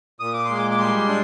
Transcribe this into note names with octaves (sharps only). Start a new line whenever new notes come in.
A#2 D#6
D6
C6
G#3
D6
D6
G3 C6
D4